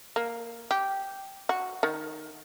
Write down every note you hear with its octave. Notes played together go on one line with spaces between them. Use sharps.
A#3
G4
F#4
D#3